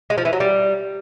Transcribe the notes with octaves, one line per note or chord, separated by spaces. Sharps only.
G#3
F3
E3
F#3
G3